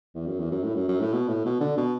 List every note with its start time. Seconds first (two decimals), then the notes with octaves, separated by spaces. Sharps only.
0.15 E2
0.27 F#2
0.39 E2
0.51 F#2
0.64 A2
0.75 F#2
0.88 F#2
1.00 A2
1.13 B2
1.28 A2
1.45 B2
1.60 D3
1.77 B2